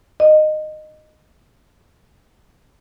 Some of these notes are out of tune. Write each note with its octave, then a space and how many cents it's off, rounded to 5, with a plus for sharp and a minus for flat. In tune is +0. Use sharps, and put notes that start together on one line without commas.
D#5 -15